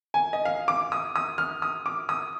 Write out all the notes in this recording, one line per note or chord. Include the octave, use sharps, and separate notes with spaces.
G#5
D#5
F5
D6
D#6
D#6
F6
D#6
D6
D#6